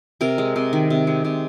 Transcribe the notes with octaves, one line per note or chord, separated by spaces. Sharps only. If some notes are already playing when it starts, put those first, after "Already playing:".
C3 A#4
G#3
C3
D#3
C3
G#3
C3